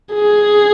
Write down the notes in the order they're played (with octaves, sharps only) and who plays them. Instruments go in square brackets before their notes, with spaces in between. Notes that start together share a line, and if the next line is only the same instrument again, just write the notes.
[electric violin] G#4